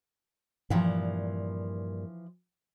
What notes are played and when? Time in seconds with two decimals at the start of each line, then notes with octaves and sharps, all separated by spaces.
0.70 G2 A#2 E3 F3